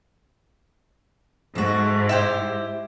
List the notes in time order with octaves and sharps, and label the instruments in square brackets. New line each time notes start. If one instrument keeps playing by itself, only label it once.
[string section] G#2 [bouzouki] A3 F#4
[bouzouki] E4 G4 C5